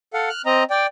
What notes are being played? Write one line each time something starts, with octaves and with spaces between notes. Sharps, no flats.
A4 F5 F#5
F6 F#6
C4 D#5 A#5
D5 G5